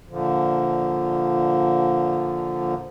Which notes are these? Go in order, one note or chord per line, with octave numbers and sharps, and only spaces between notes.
A#2 D3 F3